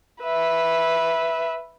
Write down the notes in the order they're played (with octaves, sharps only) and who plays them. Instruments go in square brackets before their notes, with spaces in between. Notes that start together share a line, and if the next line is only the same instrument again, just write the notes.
[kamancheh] B4 E5